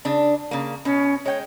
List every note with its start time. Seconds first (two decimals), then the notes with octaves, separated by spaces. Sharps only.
0.05 C#3 D4
0.51 C#3 A#3
0.85 B2 C#4
1.25 G#3 C#5 G5